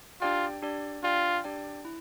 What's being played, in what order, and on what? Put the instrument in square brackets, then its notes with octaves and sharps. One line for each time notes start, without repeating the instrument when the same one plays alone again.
[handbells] D4 G4 D5 G5 [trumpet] F4
[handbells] D4 G4 D5 G5
[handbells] D4 G4 D5 G5 [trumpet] F4
[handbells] D4 G4 D5 G5
E4